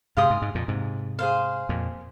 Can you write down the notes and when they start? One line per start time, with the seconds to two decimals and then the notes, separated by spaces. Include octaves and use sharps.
0.17 G#2 C3 G#4 F5 C6 D#6
0.30 G#2
0.42 G#2
0.55 F2 A#2
0.68 G#2 C3
1.19 G#4 C5 F5
1.69 F2 A#2